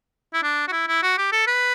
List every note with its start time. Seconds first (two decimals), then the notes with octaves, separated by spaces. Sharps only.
0.34 E4
0.43 D4
0.68 F#4
0.73 E4
0.88 E4
1.03 F#4
1.18 G4
1.32 A4
1.47 B4